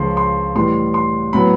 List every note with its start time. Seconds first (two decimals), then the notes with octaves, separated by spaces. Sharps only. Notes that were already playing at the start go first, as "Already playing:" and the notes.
Already playing: C#2 C#3 F3 C6
0.17 C6
0.55 A2 E3 G3 C6
0.94 C6
1.33 A2 F#3 B3 B5